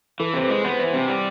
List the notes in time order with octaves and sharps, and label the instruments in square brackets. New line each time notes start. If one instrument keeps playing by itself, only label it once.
[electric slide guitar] E3 [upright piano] A4
[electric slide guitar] C3 [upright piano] C5
[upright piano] B4
[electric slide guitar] G#3
[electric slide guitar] B3 [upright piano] C5
[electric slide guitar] E3
C3
G3